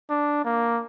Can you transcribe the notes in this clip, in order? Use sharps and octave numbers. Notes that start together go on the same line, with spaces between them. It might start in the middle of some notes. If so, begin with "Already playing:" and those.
D4
A#3